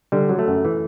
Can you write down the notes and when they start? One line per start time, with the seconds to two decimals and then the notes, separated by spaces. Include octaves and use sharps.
0.12 D3 G3
0.29 F#3
0.39 A3
0.48 F#2
0.65 E3